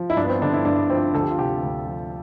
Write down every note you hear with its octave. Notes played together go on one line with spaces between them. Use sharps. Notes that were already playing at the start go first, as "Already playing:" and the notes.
Already playing: F3
E4
G2 D4
B3
C4
D3 D4
E4
G2 D4
F3 C4
D2 A4
G4
F4
C3 G4
D2
F3